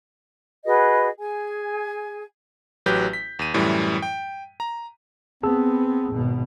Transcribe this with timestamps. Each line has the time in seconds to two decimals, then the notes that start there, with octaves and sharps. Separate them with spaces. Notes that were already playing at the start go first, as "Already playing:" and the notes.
0.65 F#4 G#4 B4 D#5
1.19 G#4 G#5
2.86 A1 F#3 G4 B4 G6
3.13 B6
3.39 D#2 D#7
3.54 F#2 A2 E3 G3
4.02 G5
4.60 A#5
5.43 B3 C4 G#4 A5 E6
6.10 G#1 B2